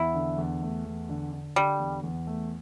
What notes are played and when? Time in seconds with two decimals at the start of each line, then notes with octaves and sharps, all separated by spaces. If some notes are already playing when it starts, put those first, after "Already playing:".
Already playing: E2 E4
0.15 D3
0.38 E2
0.62 A3
0.86 E2
1.09 D3
1.33 D3
1.56 D3 G3
1.80 E2
2.03 E2
2.27 A3